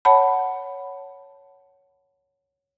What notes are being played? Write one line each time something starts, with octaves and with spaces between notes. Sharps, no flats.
C#5 F#5 A5 B5